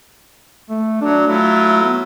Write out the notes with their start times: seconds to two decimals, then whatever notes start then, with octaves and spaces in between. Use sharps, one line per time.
0.70 A3
1.02 F#3 D4
1.27 F#3 A3 E4 F4
1.83 B3